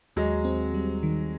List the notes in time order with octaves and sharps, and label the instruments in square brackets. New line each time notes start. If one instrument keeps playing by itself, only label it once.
[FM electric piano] D#2 [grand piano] F#3 G#3
[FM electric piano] C4
G3
D#3